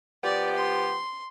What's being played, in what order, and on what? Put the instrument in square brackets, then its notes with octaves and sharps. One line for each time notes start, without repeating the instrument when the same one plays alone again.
[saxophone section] F3 B3 G4 [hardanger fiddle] D5
[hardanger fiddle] C6